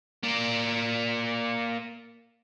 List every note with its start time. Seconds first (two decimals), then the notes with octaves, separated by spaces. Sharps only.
0.23 A#3 D5